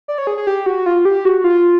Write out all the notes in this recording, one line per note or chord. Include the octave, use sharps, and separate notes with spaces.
D5
C#5
G#4
G#4
G4
F#4
F4
G4
F#4
F4